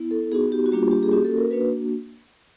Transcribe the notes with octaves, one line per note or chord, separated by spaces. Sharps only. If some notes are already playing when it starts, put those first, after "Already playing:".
Already playing: B3 E4
A4
B3 D#4 F#4 G#4
G4
F#4
G3 A#3 D4 F4 G4
G4
G#4
A#3 C#4 F#4 G4
A4
A#4
A#3 D4 F#4 B4